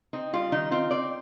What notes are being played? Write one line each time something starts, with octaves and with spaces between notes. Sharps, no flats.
C4 D#4
G3 F4
D#3 D#4
C4 F4
C4 D5